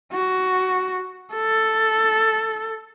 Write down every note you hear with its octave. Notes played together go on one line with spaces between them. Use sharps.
F#4
A4